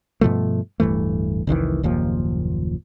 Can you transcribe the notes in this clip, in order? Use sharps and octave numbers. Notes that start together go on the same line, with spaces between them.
G2 B2 F3 A3
D1 G2 E3 A3
F1 C2 D#3 E3
F#1 D#2 A#2 F3